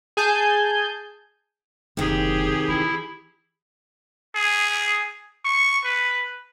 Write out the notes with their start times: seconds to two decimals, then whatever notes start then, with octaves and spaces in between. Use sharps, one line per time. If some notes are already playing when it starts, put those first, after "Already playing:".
0.17 G#4 G#5 A5 G6
1.97 F#1 C3 D#3 G4 G#4
2.68 E3 E4
4.35 G#4
5.45 C#6
5.84 B4